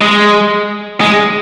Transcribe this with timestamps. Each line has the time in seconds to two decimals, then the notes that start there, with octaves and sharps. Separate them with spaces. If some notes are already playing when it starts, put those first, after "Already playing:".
0.01 G#3
1.01 G#3